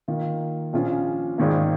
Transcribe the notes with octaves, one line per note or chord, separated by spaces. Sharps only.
D#3 A#3 F4
A#1 A#2 F3 C#4 F4
G#1 G#2 D#3 A#3